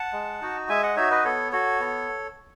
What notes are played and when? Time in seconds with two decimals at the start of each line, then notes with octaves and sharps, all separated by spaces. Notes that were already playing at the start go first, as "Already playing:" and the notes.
Already playing: F#5 A5
0.13 G#3
0.41 D#4 F#4
0.69 G#3 E5 G#5
0.83 D#5 F#5
0.97 D#4 F#4 C#5 E5
1.11 B4 D#5
1.24 B3 A4 C#5
1.52 F#4 A4 C#5
1.80 B3